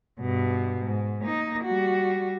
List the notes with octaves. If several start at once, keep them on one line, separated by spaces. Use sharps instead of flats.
G2 B2
G#2
A#3 D#4
G3 F#4